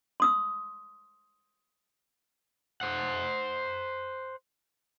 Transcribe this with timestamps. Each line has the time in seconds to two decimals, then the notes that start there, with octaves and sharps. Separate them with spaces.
0.20 C6 D#6 E6
2.81 C5 F#5